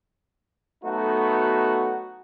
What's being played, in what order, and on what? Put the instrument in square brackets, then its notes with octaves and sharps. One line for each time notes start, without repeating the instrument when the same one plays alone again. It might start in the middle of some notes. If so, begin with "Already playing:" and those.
[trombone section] F#3 A3 B3 D#4 F#4